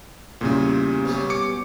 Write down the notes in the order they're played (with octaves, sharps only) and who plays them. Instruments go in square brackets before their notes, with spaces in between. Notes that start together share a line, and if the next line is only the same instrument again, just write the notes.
[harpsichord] E2 G3 [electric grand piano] A#2 C#3
[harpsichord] B2 G3 C#4
[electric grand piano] D6 C#7